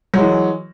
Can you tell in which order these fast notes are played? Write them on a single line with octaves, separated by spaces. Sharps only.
F#3 G#3 E3